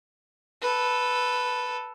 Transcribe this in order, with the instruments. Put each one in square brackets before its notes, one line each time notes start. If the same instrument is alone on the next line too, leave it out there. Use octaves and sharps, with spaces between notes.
[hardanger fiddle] A4 B4